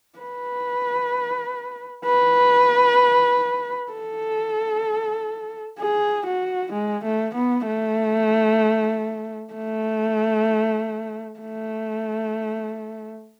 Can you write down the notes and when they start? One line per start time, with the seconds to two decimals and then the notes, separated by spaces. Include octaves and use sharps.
0.19 B4
2.05 B4
3.92 A4
5.79 G#4
6.26 F#4
6.73 G#3
7.04 A3
7.35 B3
7.66 A3
9.53 A3
11.39 A3